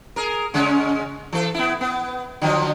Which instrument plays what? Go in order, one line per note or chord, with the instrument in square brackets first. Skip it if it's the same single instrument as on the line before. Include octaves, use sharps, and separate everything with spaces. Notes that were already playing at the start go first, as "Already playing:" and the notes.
[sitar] G#4 A#4
C#3 G#3 C#4
E3 A4
B3 E4
B3
D3 F3 F#3